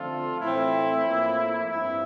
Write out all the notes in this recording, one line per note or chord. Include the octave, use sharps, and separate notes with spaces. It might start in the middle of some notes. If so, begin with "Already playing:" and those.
Already playing: D3 F3 A3 C4 F4 A4
A2 E3 A3 C4 E4
A2 F3 A#3
G2 F3 C4 E4